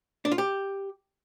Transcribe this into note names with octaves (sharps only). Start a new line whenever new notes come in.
D4
F4
G4